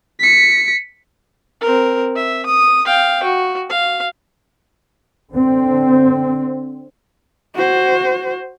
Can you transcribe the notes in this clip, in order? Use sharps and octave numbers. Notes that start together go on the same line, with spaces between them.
B6 C#7
C4 A#4
E5
D#6
F5 G5
F#4
F5
D3 C4
F#4 C5